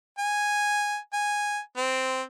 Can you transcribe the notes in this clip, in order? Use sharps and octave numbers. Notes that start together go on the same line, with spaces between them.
G#5
G#5
C4